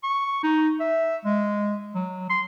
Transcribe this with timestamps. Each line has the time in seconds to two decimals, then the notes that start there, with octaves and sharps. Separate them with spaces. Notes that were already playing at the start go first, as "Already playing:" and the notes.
0.03 C#6
0.43 D#4
0.80 E5
1.25 G#3
1.95 F#3
2.30 C6